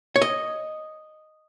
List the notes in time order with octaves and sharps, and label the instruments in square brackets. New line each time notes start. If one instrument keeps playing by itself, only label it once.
[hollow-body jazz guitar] C#5
D#5